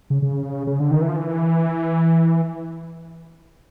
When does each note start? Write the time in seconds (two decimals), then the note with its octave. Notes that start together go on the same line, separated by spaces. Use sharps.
0.10 C#3
0.22 C#3
0.67 C#3
0.80 D3
0.91 D#3
1.01 E3
1.09 F3
1.16 E3